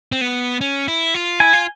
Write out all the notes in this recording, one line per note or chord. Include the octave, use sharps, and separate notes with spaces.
C4
B3
C#4
E4
F4
E4 G#5
F4